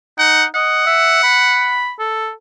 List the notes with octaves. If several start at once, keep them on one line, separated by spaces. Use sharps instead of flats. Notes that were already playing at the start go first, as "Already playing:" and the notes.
D#4 F#5
D#5 F#5
E5
B5
A4